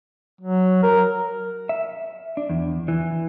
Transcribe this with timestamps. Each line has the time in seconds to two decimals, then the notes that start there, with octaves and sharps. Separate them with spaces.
0.41 F#3
0.83 A#4
1.69 E5
2.37 D4
2.50 E2
2.88 E3